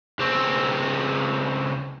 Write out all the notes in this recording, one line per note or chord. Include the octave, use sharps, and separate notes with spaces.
C#2 C4